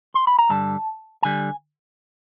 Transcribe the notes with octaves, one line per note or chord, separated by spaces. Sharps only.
C6
B5
A#5
G2 D3 G3 A5
D3 G3 G#5